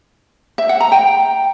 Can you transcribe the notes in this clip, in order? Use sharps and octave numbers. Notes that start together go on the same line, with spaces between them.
E5
F#5
A#5
G5